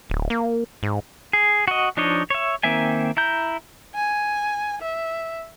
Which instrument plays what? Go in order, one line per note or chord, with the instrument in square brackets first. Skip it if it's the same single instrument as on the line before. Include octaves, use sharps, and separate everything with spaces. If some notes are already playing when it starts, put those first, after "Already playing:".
[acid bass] D1
A#3
G#2
[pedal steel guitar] G#4
F#4 D#5
F3 D4 D#4 C#5 D#5
C#5 E5
D#3 A#3 C4 E5 G#5
E4 A#5 G6
[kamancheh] G#5
E5